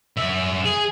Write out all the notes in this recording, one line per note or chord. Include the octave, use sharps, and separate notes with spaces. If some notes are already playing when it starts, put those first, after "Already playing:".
F#2 E5
G#4